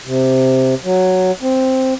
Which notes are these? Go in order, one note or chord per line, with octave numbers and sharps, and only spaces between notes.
C3
F#3
C4